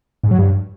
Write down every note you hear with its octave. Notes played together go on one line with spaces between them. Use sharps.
G#2
F#3
G2